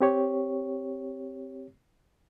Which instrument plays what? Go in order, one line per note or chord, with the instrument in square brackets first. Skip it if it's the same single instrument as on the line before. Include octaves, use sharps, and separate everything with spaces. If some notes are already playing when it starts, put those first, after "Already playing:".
[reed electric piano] C4 G4 C#5